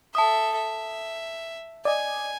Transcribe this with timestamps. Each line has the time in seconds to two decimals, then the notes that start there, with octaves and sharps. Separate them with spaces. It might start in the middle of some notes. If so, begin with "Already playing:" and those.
0.15 A4 E5 A5 D#6
0.56 E5
1.85 D5 D#5 G#5